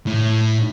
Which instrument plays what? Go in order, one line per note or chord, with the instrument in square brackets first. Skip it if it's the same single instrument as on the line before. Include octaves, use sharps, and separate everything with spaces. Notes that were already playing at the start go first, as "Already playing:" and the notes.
[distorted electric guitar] A2